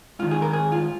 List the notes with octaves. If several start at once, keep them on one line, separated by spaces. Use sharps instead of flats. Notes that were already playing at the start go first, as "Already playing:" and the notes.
G#2 D#3 F4
G#4
A#4
G#4
F4